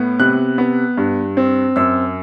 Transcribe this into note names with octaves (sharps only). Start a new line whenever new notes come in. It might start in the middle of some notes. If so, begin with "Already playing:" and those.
Already playing: A2 B3
C3 F#6
B3
G2
C4
F#2 E6